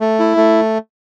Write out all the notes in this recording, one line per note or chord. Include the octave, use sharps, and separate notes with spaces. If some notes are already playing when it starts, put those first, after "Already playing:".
A3
E4
A3